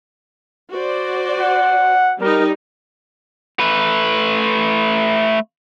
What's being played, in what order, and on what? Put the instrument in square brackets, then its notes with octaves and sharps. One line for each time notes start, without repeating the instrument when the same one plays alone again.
[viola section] F#4 C5 D5
[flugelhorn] F#5
[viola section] G3 D#4 [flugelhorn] A#4
[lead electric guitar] A3 B4